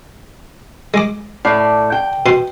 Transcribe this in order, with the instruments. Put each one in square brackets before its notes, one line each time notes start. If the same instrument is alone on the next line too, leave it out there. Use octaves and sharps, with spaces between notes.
[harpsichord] G#3 D6
[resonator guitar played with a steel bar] A2 D5
G5
[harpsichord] B2 C6